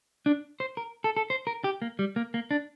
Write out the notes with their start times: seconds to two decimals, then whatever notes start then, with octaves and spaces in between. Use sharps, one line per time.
0.26 D4
0.60 C5
0.77 A#4
1.04 A4
1.17 A4
1.30 C5
1.47 A#4
1.64 G4
1.82 A#3
1.99 G3
2.16 A#3
2.34 A#3
2.51 D4